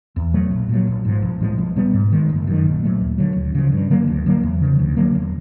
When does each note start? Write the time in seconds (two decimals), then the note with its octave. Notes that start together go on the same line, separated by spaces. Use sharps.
0.16 E2
0.33 B2 F#3 A3
0.51 A#1
0.69 A#2 F#3
0.87 A#1
1.05 G#2 F3
1.22 B1
1.41 A2 F3 G#3
1.58 B1
1.76 B2 G3 B3
1.94 G#2
2.12 D#3 G#3
2.29 F#1
2.47 F#2 D#3
2.65 A#1
2.83 A#2 F#3 A3
3.01 D#2
3.18 D3 F#3
3.37 D2
3.55 C#3 F3
3.72 G2
3.90 D3 F#3 A#3
4.08 D2
4.26 D3 F#3 A#3
4.43 E2
4.61 C#3 F3
4.79 D2
4.97 D3 F#3 A#3
5.15 E1